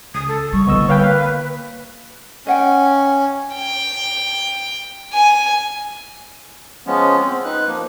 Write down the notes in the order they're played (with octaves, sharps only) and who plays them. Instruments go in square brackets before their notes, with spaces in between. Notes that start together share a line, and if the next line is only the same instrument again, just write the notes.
[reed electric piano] C#2 [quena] D#6
[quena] A4
[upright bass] G3 [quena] C#6
[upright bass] D3 E4 [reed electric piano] B3 D#5 E6
[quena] B4 [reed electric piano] C#5 F5 G5
[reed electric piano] A#3 F5
[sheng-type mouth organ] C#4 [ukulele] D#5 F#5 G5
[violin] G5
G#5
[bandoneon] F3 G#3 B3 C#4
C4
D#4 B4 F#6
F3 A#3